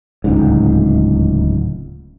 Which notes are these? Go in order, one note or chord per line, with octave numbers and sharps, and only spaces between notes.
D1 C#2 G#2